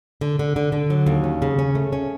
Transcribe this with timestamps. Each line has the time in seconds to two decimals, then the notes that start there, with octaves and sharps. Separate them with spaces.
0.21 D3
0.39 D3
0.56 D3
0.72 D3
0.90 F#3
1.06 D#2
1.24 C#4
1.42 C#3
1.59 C#4
1.75 A3
1.92 C#4